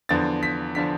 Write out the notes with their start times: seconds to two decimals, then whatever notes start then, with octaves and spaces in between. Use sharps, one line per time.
0.09 E2 D3 F3 A6
0.43 B6
0.75 D3 F3 B6